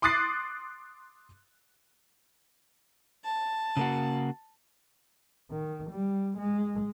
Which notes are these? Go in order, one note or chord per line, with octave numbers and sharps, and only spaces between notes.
C6 D6 D#6 F#6 A6 C7
A5
C#3 A#3 F#4
D#3
G3
G#3